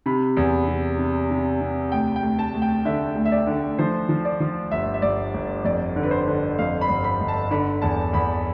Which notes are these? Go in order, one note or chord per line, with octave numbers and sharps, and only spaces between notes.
C3 B5
E2
C3
C3
C3
C3
D2 G5
G5
D2
A5
D2
G5
D3 E5
D2
E5
D5
D3
F3 C5
F3
D5
F3
G1 E5
E5
G1 D5
G1
F2 D5
D3
B4
C5
D3
F2 F5
B5
G1
B5
G1
A5
D3 B5
E2 A5
A5
E2 B5